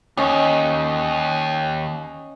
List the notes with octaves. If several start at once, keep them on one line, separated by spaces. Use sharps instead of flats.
D#2 C#4 D#5